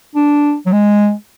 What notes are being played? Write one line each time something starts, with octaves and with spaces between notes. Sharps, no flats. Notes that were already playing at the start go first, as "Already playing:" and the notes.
D4
F#3
G#3